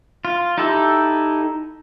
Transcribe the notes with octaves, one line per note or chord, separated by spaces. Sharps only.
F4
D#4 E4 G4 A4